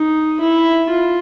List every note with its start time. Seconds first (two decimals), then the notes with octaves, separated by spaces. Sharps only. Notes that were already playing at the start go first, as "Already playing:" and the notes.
Already playing: D#4
0.41 E4
0.89 F4